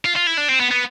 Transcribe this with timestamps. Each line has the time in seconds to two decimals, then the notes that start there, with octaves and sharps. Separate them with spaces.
0.05 F4
0.16 F4
0.27 E4
0.38 D4
0.49 C4
0.60 B3
0.71 B3